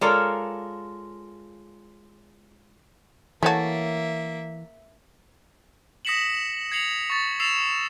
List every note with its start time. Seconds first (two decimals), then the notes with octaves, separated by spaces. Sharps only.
0.01 G#3 F4 A4 A#4 C#5 D5
3.43 E3 A3 A#3 C#4 F#4 C#5 E5 A5
6.05 D#6 A#6 B6 C#7 E7 F#7
6.72 G#6 C7 C#7 F7 F#7
7.10 C#6 A6
7.40 E6 A6 C7 E7 F7